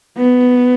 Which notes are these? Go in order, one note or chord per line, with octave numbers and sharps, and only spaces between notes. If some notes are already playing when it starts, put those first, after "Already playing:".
B3